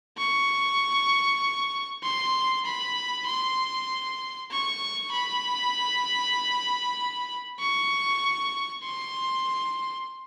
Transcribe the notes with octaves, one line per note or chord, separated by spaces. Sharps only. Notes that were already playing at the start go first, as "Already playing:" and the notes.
C#6
C6
B5
C6
C#6
B5
C#6
C6